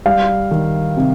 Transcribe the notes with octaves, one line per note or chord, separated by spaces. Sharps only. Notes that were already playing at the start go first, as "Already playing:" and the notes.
G3 F5
D#3
C3